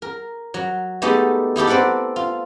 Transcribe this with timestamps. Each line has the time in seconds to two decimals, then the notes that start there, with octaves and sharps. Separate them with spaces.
0.02 A#4
0.54 F#3
1.02 G#3 A3 B3 D#4 G4 A4
1.56 D#4 E4 G4 A4
1.67 C4 A4 B4 D5 F#5
2.16 F4